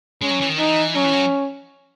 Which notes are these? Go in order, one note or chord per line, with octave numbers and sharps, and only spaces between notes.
G#3 C#4
F#3
E3
D#3
E3 D#4
F#3 C#4
E3
F#3